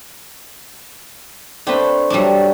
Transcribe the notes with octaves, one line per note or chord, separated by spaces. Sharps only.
A3 C4 D4 B4
F#3 G3 D4 A5